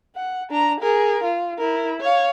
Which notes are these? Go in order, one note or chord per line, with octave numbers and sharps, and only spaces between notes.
F#5
D4 A#5
G#4 A#4
F4
E4 A#4
C#5 F5